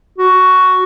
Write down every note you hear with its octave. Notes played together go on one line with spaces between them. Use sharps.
F#4